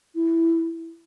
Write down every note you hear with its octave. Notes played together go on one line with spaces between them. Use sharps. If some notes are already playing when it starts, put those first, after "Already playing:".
E4